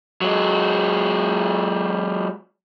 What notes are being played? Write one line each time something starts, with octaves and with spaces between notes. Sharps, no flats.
F#3 G#3